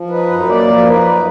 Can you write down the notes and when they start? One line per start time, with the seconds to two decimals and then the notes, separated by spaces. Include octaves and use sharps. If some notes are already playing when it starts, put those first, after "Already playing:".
Already playing: F3
0.10 D#4 B4
0.29 F#2
0.39 B4
0.48 A#3 D5
0.67 F3
0.86 D#4 B4
1.05 F#2